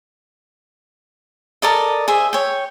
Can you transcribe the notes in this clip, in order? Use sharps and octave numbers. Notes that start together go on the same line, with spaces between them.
A4 A#4 D5 D#5
G#4 C5 E5
C#5 G5